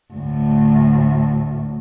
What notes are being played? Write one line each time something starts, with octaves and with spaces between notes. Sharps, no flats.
D2 A2